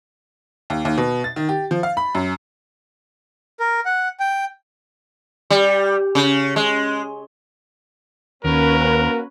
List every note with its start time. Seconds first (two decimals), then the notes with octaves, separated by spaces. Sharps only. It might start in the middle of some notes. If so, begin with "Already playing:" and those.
0.70 D#2
0.85 D#2
0.98 B2
1.24 A6
1.36 D#3
1.49 G4
1.71 F3
1.83 F5
1.97 B5
2.15 F#2
3.60 A#4
3.85 F#5
4.20 G5
5.50 G3
6.15 C#3
6.56 G#3
8.45 D#2 A#3 C#4 F#4 A#4 B4